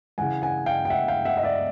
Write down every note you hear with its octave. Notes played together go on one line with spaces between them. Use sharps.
C#3 E3 F#5 G#5
F#5 G#5
F5 G5
G5
E5 F#5
F5 G5
E5 F#5
D#5
D5 E5